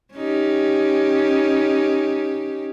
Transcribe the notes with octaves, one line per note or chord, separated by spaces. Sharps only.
C#4 D#4 G4